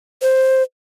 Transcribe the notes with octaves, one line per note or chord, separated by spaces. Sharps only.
C5